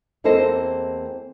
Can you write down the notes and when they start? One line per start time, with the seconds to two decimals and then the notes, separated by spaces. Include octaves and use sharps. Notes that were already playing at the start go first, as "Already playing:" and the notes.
0.24 E2 A#3 C4 A4 C5 D#5